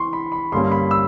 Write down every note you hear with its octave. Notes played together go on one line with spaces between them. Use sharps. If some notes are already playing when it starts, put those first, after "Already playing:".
Already playing: E3 C6 C#6
B5
B5
G2 D3 G3 A#3 C#4 C6
B5
E6